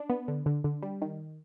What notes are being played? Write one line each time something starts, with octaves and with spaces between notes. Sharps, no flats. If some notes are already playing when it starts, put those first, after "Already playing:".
Already playing: D4
B3
D3
D3
D3
G3
D#3